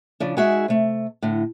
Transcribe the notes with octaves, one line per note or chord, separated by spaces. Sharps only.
C#3 F3 D4
G#3 D#4 F#4 G#4 E5
C3 A3
A2 D3